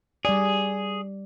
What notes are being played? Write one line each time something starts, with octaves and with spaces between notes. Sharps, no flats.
G3 G#4 D5